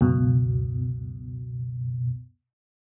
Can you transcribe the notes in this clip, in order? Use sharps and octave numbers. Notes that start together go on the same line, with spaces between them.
C#2 F#2 B2